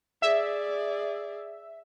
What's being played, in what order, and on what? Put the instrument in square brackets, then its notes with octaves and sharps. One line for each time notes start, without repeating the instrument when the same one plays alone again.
[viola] G#4 D5 [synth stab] E5